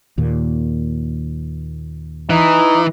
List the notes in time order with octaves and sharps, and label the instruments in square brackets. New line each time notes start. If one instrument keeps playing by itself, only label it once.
[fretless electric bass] D#2 A#2
[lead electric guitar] E3 [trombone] D#4